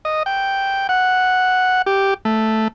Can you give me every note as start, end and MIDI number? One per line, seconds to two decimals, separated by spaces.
0.05 0.23 75
0.26 0.87 79
0.89 1.82 78
1.86 2.14 67
2.25 2.68 57